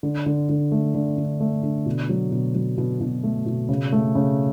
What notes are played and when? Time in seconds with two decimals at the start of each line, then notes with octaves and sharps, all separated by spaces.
0.03 D3
0.26 D3
0.49 D3
0.72 A3
0.95 D3
1.18 D3
1.40 A3
1.63 D3
1.86 B2
2.09 F#3
2.32 B2
2.55 F#3
2.78 B2
3.01 B2
3.23 A3
3.46 B2
3.69 C#3
3.92 A3
4.15 C#3